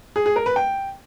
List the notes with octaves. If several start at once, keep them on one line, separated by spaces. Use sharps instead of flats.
G#4
G#4
A#4
B4
G5